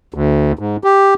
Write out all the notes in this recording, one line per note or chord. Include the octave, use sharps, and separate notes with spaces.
D2
G#2
G4